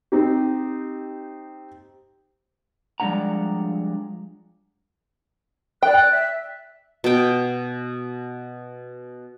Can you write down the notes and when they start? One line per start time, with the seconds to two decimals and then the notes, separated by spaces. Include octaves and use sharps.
0.12 C4 D#4 G4
3.00 F3 G3 G#3 D4 F#5 A#5
5.83 D5 G5 F#6
6.10 E5
7.04 B2 G5